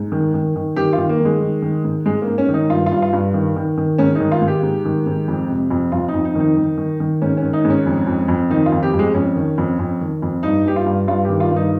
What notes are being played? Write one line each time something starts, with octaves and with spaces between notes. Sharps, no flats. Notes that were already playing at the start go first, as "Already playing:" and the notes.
Already playing: G#2
D#3
D#3
D#3
D#3 G4
F4
D#3
A#3
D#3
G#3
D#3
D#3
G#2
G#2 G#3
A#3
G#2
C#4
D#3 D#4
G2 F4
F4
G2
F4
G2
D#3
D#3
D#3
G#2 C#4
D#4
D#3
F4
G#2
G4
G#2
D#3
G#2
F2
C3
F2
F2 F4
D#4
F2
D#4
D#3 D#4
D#3
D#3
D#3
G#2 C#4
C#4
D#3
D#4
G#2
C#4
F2
F2
F2
D#3 D#4
F4
F2
G4
F2
G#3
F2 C#4
D#3
F2
F2
D#3
F2
G2 D#4
G2 G4
F4
G2
G2 F4
D#3 G4
F4
G2
D#4